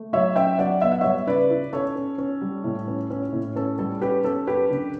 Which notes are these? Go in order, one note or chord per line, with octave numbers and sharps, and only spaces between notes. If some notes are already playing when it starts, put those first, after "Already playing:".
Already playing: A3
F#3 C#5 E5
C#4 E5 G5
F#3 D5 F#5
B3 E5
F#5
G3 C#5 E5
C#3 B4 D5
E4
C#4 A4 C#5
C#4
C#4
G3
A2
C#4
C#4
A2
C#4 A4
G3 A4
C#4 G4 B4
C#4 A4
F#2 G4 B4
D3